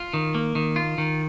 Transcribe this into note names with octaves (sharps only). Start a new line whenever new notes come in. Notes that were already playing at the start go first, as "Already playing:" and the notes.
Already playing: F4
D#3
A#3
D#3
F4
D#3